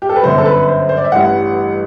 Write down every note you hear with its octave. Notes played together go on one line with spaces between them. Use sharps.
G4
A4
B4
G1 F#2 D3 F#3 C5
A4
B4
C5
C5
D5
E5
A1 G2 E3 G3 F#5